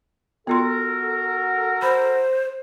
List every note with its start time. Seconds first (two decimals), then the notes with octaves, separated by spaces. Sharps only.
0.47 B3 F4 F#4 A4 A#4 C6
1.82 C5 B5